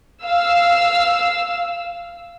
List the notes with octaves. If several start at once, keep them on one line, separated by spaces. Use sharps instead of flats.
F5 E6